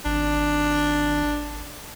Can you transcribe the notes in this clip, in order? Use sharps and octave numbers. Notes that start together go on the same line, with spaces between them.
G#1 D4